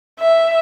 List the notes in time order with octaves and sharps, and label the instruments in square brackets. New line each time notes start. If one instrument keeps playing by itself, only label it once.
[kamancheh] E5